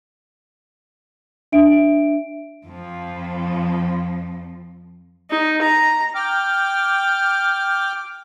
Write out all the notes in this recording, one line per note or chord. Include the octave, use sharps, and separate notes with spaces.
D4 E5 D7
F2 F3
D#4
A#5
G5 D6 F6